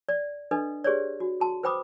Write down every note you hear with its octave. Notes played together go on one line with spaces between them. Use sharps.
D5
D4 A4 B4 D#5
G4 G#4 B4 C#5 D5
F#4
F#4 A5 C6
B4 C5 G5 B5 D6 D#6